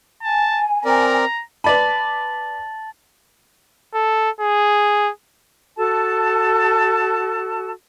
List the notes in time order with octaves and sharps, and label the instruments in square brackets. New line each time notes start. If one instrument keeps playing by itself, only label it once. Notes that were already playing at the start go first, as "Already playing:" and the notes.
[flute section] G#5 [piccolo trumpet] A5
[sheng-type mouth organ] C4 A#4 D5 [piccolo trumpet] A#5
[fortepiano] B4 D5 B5 [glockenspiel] A5 A6 F#7
[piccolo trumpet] A4
G#4
[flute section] F#4 A4 A5